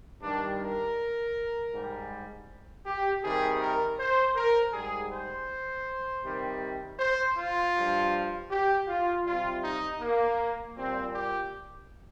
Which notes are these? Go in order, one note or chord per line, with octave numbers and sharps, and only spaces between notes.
G2 D#3 G3 D4
A#4
G#2 G3
G4
C3 D#3 G3 G#4
A#4
C5
A#4
G#2 G3 G#4
C5
C3 D#3 G3
C5
F4
G2 F3
G4
F4
C3 G3 F4
D#4
A#3
A#2 G3 C4
G4